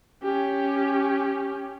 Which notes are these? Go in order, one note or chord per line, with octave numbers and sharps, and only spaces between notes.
C#4 G4